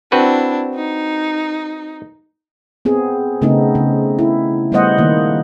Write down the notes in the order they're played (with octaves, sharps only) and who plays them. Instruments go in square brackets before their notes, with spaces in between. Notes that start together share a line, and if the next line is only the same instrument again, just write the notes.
[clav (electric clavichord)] C4 F#4 B4 [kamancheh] D4 E4
[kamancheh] D#4
[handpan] B3 C4 G#4
C#3 A3 B3 C4 D#4
C#3
E4
G3 A3 B3 C5 D#5 F#5
D#3 A#3